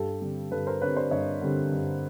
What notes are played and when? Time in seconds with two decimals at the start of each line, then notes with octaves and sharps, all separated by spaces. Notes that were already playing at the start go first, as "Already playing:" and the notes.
Already playing: G2 G4 A4
0.22 D3 G3 C4
0.51 G2 A4 B4
0.67 A#4 C5
0.81 D3 G3 C4 B4 C#5
0.96 C5 D5
1.11 G2 C#5 D#5
1.41 D3 G3 C4
1.72 G2